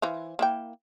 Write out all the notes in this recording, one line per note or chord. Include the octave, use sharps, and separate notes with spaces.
E3 C5 F5
A#3 E4 G5